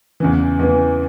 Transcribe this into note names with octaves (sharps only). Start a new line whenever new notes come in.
E2 C#3 E3
E2 C#3 E3